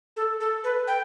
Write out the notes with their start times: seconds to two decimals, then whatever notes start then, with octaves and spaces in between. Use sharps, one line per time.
0.16 A4
0.40 A4
0.64 B4
0.88 G5